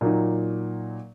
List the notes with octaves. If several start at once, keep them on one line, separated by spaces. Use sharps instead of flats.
A#2 F#3 A#3 D#4